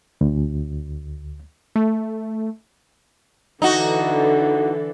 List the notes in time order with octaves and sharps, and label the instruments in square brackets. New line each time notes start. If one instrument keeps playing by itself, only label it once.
[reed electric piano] D2
[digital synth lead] A3
[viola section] D3 E3 A4 [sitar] D#4 F#4